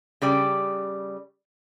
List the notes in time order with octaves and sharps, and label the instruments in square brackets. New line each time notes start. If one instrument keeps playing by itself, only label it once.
[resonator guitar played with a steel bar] C#3 G3 D5